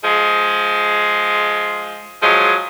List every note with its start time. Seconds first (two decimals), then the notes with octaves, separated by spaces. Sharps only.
0.04 F3 G#3
2.22 F3 F#3 G#3